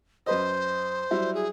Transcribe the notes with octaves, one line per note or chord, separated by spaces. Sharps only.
F#2 B4 C5 D#5
F#3 G3 E4
G#4